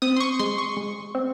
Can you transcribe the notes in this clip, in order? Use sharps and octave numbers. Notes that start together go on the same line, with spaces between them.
C4 D#6
C6
C#6
G#3 C6
C#6
G#3
C4